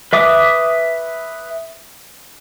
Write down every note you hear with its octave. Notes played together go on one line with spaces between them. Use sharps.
B4 E5 D6 D#6